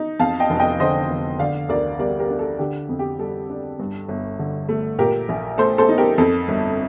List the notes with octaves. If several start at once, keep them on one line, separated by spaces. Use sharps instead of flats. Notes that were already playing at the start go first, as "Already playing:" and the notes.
Already playing: D#4
F2 F5 A5
D#5 G5
F1
D#5 G5
D3 C5 D#5
F1
D3 D5 F5
D2 A#4 D5
G3 A#4 D5
G4 A#4
D4
A4
D3 G4
F2
G4
G3 A4
D4
G2
G1
D3
A3
A#2 G4 A#4
A#1
A3 A4 C5
A4 C5
D#4
G4 A#4
F2 A4
G1